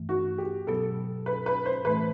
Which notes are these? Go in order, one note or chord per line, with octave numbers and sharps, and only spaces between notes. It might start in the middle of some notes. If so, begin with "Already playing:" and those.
Already playing: G2 E3 A3
F#4
G4
B2 F#3 B3 A4
B4
B4
C5
A2 E3 A3 B4